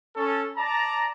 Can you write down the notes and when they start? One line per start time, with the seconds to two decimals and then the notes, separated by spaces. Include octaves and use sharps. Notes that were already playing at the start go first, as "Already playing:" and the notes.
0.16 C#4 A4
0.58 D5 A5 A#5